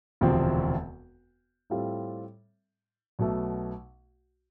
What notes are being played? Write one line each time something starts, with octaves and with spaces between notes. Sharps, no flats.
E1 D2 C3 F3 C4
A2 G3 C4 F4 A4
B1 B2 A3